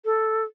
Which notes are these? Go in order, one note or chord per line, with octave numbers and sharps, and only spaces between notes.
A4